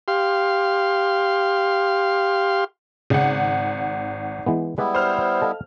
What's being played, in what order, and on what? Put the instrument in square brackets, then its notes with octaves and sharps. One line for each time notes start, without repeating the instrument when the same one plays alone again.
[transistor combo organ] G4 F5 C6
[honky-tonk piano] G#1 F#5 [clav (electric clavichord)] C#3
[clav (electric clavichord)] E3 G#3 B3
[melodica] G3 B3 E4 [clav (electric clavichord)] G#3 B4 D5
[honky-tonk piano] C5 F6
[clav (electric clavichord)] A4 D#5 F5